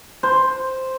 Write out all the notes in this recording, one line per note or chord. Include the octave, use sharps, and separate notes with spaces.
C5